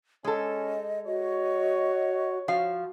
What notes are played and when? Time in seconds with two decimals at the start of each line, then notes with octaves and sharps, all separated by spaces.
0.24 G#3 C#4 A4 D#5
1.06 F#4 C#5 D#5
2.48 F3 F#4 F5